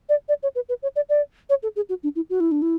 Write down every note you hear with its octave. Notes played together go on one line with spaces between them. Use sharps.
D5
D5
C#5
B4
B4
C#5
D5
D5
C#5
A4
G#4
F#4
D4
E4
F#4
E4
D4
E4